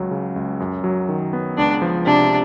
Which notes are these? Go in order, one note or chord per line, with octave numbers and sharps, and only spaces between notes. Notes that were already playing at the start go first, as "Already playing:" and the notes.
Already playing: C#2 F#3
C#3
C#2
F#2
F#3
D#3
B3
C#2 D4
F3
C3 D4